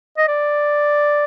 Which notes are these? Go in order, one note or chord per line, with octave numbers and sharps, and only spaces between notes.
D#5
D5